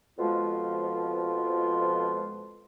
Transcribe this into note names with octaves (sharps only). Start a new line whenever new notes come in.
F2 B2 F3 G#3 F4